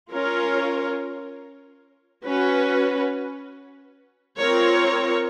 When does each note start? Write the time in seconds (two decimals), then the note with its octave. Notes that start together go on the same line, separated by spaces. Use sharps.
0.12 C#4 F4 A#4 C#5
2.25 C#4 F#4 B4
4.38 C4 F4 A#4 C#5